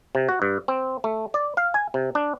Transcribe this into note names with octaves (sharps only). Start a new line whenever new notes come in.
C3
F#4
G2
C4
A3
D5
F5
G#5
C3
D4